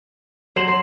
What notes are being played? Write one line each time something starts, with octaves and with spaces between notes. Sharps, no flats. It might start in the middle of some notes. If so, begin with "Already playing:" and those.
F#3 C5 E7 F#7
C6